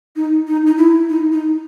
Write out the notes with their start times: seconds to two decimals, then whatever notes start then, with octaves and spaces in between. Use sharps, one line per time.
0.16 D#4
0.47 D#4
0.66 D#4
0.78 E4
1.09 D#4
1.32 D#4